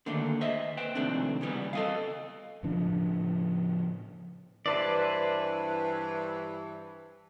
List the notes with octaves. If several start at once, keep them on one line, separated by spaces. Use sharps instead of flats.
D3 D#3 A3 A#3
C5 D#5 E5
B4 C5 G5
C3 D#3 F3 A3 C4 D4
C#3 E3 G3 B3
A4 D#5 F5
A2 C#3 F3 D4
G2 E3 B4 C5 D5